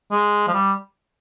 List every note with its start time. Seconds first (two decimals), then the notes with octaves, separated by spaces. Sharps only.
0.11 G#3
0.48 F3
0.54 G3